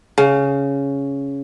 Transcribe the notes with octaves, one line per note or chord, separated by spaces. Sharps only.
C#3